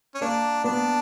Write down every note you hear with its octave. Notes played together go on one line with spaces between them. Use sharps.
C#4
A#3 D4
B3 D4